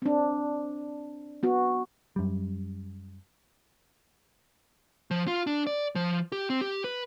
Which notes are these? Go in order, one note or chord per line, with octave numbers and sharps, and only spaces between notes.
C4 D4
B3 F#4
F#2 G3
F3
F4
D4
D5
F3
G4
C4
G4
B4